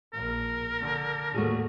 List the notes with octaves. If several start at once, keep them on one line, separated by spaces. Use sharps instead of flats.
A#1 A#4
D3
D#2 A2 A3 F#4 G#4